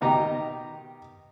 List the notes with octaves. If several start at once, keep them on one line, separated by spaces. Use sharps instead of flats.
B2 D#3 D#4 G4 A#5